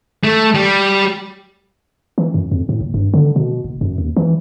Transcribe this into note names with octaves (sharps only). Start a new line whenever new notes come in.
A3
G3
E3
F#2
F2
A2
F#1
G2
D3
B2
F#1
F#2
D#2
E3